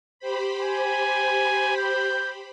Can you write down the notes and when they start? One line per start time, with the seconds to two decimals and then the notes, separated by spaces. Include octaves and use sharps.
0.19 G4 C5 B5
0.62 G#5
1.77 G6